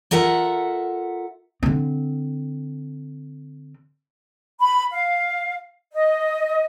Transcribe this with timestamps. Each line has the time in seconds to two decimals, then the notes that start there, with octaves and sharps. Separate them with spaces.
0.11 F4 A4 A#4 E5 F#5
1.63 D3 C4
4.60 B5
4.93 F5
5.93 D#5